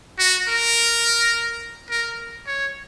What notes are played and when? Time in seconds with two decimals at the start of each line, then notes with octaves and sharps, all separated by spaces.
0.19 F#4
0.48 A#4
1.90 A#4
2.47 C#5